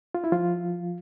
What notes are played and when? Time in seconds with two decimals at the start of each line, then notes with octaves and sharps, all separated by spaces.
0.15 F4
0.24 E4
0.32 F3 F4